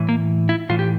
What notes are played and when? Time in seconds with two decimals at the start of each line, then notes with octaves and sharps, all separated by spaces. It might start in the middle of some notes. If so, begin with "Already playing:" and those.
Already playing: A2 E3
0.09 A#3
0.49 E4
0.69 A2 E3 F4
0.79 G4